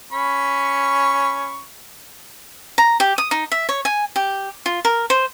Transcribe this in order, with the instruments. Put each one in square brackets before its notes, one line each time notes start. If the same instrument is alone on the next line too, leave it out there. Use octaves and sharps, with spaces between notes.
[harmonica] C#4 B5 C#6
[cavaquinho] A#5
G4
D#6
D#4
E5
C#5
G#5
G4
F4
A#4
C5